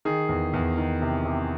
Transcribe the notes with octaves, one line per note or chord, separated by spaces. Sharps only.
D#3 G#4
E2
E2
D#3
C3
C3